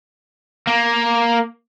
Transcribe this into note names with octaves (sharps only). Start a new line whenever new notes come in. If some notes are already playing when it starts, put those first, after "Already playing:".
A#3